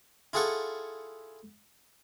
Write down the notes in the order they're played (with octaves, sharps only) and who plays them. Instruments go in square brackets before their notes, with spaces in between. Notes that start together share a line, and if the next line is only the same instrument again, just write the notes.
[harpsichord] E4 F4 G#4 A4 F#5 C#6